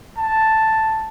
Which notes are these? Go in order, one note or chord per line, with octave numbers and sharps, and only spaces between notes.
A5